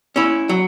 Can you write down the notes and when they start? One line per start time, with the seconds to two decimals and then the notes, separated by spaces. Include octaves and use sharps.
0.16 C#4 E4
0.49 F#3